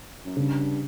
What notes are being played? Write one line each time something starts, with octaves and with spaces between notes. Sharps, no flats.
F#2
G2 C#3